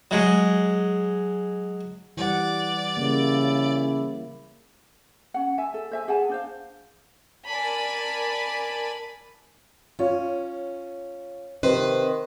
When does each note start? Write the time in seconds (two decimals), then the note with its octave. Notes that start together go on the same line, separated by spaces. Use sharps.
0.11 F#3 G#3
2.17 E3 G3 D5 F#5
2.97 C#3 A#3 E4
5.34 C#4 F#5
5.58 E5 G#5 A5
5.74 A4
5.92 C5 E5 G#5
6.08 G#4 F#5 G#5 A5
6.29 D4 C5 F5
7.45 A#4 D5 G#5 A5 B5
9.99 C#4 F4 C#5
11.63 C3 D#3 B4 C5